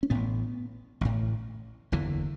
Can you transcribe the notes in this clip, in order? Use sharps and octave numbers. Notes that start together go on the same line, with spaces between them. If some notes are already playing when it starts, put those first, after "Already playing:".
C#4
A1 A2 B3
A1 A2
F#1 E2 D3 E3